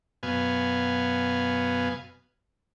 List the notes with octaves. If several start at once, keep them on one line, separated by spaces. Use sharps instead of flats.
F#2 B2 B3 F5 G#5